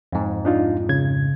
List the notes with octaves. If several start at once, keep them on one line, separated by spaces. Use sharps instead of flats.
F2 G#2
D4 D#4 F4
C#3 G#6